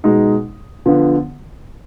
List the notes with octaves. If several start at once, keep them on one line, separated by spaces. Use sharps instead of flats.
B2 G#3 D#4
D3 F3 B3